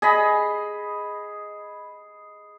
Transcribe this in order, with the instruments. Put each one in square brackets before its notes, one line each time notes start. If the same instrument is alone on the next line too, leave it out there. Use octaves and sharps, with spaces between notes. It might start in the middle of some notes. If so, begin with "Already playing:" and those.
[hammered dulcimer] G#4 D#5 B5